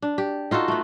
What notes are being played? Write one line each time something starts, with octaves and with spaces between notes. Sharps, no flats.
D4
G4
D#4 F4 F#4 A4
A3 B3